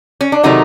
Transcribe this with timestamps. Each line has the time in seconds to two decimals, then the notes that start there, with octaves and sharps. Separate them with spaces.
0.21 C#4
0.32 D4
0.43 C3 D#3 F#3 A3 D#4